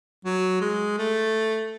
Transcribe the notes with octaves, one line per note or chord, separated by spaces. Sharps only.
F#3
G#3
A3